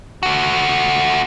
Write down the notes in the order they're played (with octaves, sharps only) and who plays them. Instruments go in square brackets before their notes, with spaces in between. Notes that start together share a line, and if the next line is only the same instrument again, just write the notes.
[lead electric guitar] A3 F#4